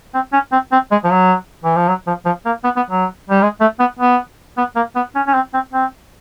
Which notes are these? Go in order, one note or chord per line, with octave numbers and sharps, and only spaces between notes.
C4
C#4
C4
C4
G#3
F3
F#3
E3
F3
F#3
F3
F3
A#3
B3
B3
F#3
G3
G#3
A3
B3
B3
B3
A#3
B3
C#4
C#4
C4
C4
C4